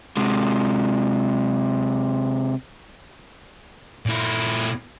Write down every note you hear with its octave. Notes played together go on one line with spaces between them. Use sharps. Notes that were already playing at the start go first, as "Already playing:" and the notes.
C3 G#3
A#2 E4